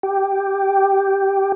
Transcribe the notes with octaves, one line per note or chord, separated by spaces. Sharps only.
G4